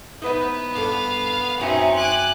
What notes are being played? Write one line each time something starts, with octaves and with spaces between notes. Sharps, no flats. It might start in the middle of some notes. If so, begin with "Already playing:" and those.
B3 D#4 B4 D#5
G2 D4 A4 F5
F#2 C4 C#4 D#4 F#4 E5
G#5 D6 F#6